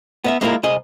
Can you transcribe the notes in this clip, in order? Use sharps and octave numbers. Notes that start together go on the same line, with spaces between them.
B3 D#5 E5
G#3 A#3 D4 E4 F4 A#4
C2 G#4 D#5